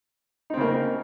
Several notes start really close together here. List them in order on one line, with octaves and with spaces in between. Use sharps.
D#4 C4 C#3 A#3